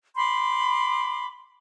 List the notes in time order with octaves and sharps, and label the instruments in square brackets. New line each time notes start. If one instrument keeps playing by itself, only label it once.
[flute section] B5 C6 D6